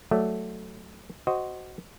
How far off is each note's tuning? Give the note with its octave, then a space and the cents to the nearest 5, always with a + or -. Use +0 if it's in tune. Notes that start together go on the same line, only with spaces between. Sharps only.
F#3 +0 A3 +0 D5 +0
F#4 +10 C5 +0 D#5 +0